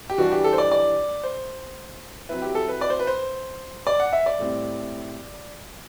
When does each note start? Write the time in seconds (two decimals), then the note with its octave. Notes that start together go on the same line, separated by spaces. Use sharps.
0.10 G4
0.18 E3 G3 D4 F#4
0.31 G4
0.44 A4
0.53 C5
0.58 D5
0.72 D5
1.24 C5
2.29 F#3 C4 E4 B4
2.42 G4
2.55 A4
2.68 B4
2.81 D5
2.90 C5
2.99 B4
3.07 C5
3.87 D5
4.00 F#5
4.13 E5
4.26 D5
4.39 A2 G3 C4 E4